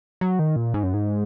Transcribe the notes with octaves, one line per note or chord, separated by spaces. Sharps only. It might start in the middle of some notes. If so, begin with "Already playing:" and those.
F#3
D#3
A#2
G#2
F#2
G#2